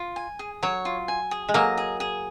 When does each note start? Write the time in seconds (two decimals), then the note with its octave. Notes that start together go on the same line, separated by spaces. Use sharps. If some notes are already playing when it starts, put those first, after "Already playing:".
Already playing: F4
0.16 G#5
0.39 G#4
0.63 F#3 C#5
0.85 F4
1.08 G#5
1.31 G#4
1.49 G#3
1.54 F#3 A#3 D#5
1.78 G#4
2.00 G#4